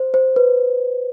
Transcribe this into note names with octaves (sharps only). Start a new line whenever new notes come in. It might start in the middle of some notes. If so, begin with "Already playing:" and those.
Already playing: C5
C5
B4